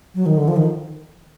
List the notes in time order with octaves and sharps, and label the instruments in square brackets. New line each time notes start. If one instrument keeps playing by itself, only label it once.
[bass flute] F#3
D#3
D3
F3
D#3